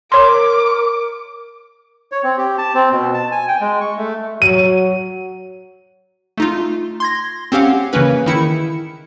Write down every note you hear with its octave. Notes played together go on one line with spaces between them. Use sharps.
A#4 C#5 C6 D6
C#5
C4
G4
A5
C4
B2
A5
G#5
G5
G#3
C#6
A3
F#3 D#7
A3 D#4 F4
C6 G#6 A#6
C4 C#4 G4 F5 F#5
C#3 E3 A#3 C#4 B4
D#3 E4 C#7